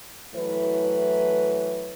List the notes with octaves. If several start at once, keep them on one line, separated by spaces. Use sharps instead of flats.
E3 F#3 A3 E4 B4